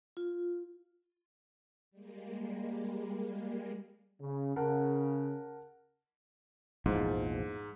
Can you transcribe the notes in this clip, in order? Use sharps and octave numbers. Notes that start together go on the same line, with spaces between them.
F4
G3 G#3 A#3
C#3
C#3 A#4 F#5 A5
A#1 E2 G#2 F3